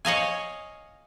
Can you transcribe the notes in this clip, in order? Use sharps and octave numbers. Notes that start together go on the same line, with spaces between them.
C#5 D#5 F5 G#5